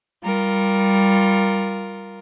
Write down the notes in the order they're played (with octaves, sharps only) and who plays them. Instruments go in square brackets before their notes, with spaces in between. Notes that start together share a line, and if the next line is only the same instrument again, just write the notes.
[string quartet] G3 F4 A#4